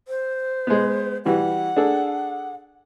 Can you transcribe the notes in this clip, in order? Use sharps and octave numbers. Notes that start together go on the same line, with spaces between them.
C5
G#3 B3
E3 G3 F#4 F#5
D4 G#4 A4